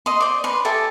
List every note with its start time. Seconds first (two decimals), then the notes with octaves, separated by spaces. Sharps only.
0.06 D#5 C6
0.21 C5 D5
0.44 B4 C6
0.65 G4 A4 E5 G#5